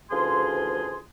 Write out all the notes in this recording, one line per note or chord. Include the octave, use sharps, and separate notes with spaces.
D2 C#3 E3 F3 G#4 C6